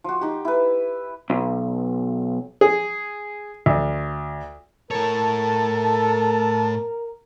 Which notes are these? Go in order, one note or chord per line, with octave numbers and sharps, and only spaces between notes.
F3 F#4
D#4 G4
E4 B4
B1
G#4
D2
A2 A4 A#4 C#5 A5